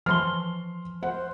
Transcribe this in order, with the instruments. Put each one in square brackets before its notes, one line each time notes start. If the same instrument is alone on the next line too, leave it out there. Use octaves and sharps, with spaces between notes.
[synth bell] E3 F3 G7 [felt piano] C6 F6
[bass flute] C5 [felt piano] F#5